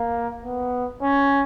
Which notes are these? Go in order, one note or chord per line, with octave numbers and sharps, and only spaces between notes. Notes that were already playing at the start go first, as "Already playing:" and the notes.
Already playing: A#3
B3
C#4